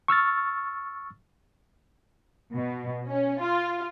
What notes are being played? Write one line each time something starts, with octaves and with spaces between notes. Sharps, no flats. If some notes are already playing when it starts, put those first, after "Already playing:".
C#6 E6 F6 A6
B2
C#4
F4